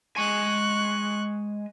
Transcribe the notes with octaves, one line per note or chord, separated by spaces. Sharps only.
G#3 G#5 C#6 F#6